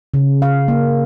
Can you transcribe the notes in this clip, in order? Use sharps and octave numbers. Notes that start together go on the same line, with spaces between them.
C#3
F5
A#3